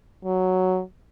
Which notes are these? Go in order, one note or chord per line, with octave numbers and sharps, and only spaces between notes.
F#3